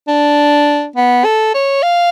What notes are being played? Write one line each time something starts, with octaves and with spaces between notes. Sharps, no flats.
D4
B3
A4
C#5
F5